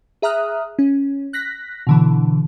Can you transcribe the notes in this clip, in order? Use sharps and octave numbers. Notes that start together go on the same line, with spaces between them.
G#4 E5 A#5 D#6 F6 F#6
C#4
F#6 A#6 B6
B2 D3 E3